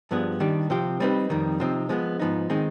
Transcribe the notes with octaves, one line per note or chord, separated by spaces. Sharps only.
G2 F3 B3 D4 G#4
D#3 G3 D4 G4
C3 F3 C4 G4
G3 C4 D#4 B4
F2 D#3 G3
C3 F3 C4 D#4
F3 G#3 B3
G#2 F3 B3 D#4
D#3 G#3 C4 D#4